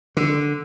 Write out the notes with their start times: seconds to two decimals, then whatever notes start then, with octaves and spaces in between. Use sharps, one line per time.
0.17 D3